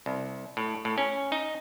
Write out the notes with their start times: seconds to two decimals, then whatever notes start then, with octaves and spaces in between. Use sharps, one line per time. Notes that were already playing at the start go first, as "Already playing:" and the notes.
0.06 C2
0.57 A2
0.85 A2
0.98 C#4
1.32 D#4